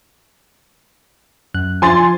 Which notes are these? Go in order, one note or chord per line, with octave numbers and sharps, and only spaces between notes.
F#2 F#6
F3 G#5 C6 A6